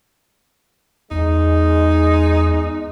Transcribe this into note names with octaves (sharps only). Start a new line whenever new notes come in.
E2 G#3 D#4